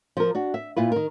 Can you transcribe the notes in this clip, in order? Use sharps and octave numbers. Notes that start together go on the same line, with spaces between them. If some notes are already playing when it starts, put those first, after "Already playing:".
F3 A#4
D4 F#4
E5
A#2 E4 F4 B4
D#3 A#4